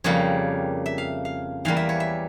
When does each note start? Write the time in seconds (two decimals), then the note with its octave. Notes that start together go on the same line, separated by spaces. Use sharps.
0.04 F2 C#3 G3 A#3 C#5
0.86 E5
0.98 F5
1.25 F5
1.65 E2 E3 G3 A#3 F5
1.77 E5
1.89 C#5
2.00 E5